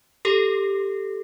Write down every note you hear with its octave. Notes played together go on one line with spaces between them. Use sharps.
G4 A4